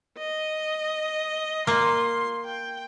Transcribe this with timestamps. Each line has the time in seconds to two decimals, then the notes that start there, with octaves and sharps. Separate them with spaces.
0.19 D#5
1.67 A#3 F4 C6
2.46 G5